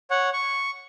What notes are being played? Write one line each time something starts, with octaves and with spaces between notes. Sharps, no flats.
C#5 F#5
C#6